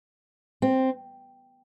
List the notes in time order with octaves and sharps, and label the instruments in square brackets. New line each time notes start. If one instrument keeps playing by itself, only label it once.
[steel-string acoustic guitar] C4